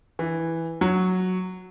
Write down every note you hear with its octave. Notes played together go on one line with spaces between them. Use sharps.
E3
F#3